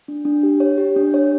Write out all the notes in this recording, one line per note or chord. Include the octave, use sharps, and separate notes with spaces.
D4
D4
G4
C#5
G4
D4
C#5